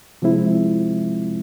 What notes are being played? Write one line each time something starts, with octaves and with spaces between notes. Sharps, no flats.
C3 F3 G#3 C4 E4